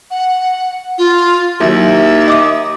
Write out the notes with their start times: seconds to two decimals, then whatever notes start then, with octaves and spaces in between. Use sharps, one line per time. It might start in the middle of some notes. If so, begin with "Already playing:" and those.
0.11 F#5
0.98 F4
1.60 D#2 D#3 F#3 E4 E5
2.28 D#5 D6 D#6